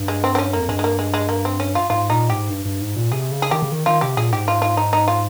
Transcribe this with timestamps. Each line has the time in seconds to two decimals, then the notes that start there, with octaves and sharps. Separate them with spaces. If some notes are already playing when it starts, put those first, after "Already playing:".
Already playing: G2
0.08 G#3
0.24 C4
0.35 C4
0.38 C#4
0.53 F2 A#3
0.69 G2 G#3
0.79 G#3
0.84 A#3
0.99 G#3
1.14 G#3
1.29 A#3
1.45 C4
1.60 C#4
1.75 F4
1.90 G#2 F4
2.10 A#2 D#4
2.30 G#2 G4
2.50 G2
2.65 G2
2.81 G#2
2.96 A#2
3.11 C3 G#4
3.32 C#3
3.42 G#4
3.51 D#3 G4
3.62 C#3
3.72 D#3
3.86 D#3 F4
4.01 C3 G4
4.17 A#2 G#4
4.32 G#2 G4
4.48 F4
4.62 F4
4.77 D#4
4.93 D#4
5.08 F4